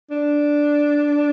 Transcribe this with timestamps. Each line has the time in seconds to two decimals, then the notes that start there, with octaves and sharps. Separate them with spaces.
0.11 D4